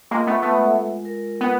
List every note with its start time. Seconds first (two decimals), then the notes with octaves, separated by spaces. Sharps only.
0.11 G#3 A#3 F4
0.27 A3 B3
0.35 G#3
0.42 A3 B3
0.58 G#3
0.81 G#3
1.05 A#4
1.28 F4
1.41 B3